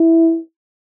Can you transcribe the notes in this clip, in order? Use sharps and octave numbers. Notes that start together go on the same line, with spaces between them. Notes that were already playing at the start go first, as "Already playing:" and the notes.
Already playing: E4